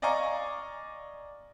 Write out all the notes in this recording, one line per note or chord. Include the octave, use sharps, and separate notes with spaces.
D5 D#5 F5 G#5 A#5 C#6